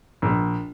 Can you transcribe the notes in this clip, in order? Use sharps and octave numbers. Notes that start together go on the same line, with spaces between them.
A#1